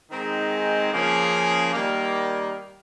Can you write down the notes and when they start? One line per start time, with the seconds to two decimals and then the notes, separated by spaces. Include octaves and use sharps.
0.12 D#3 G#3 C4 D#4 G#4
0.92 C#3 F3 A#3 C#4 G#4
1.73 D#3 G3 A#3